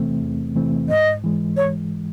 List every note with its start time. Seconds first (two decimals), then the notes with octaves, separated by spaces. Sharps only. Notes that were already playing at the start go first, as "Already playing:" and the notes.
Already playing: E2 C3 E3 A3 C4
0.22 E2
0.56 C3 E3 A3 C4
0.89 G#2 D#5
1.24 E3 G#3
1.57 C#5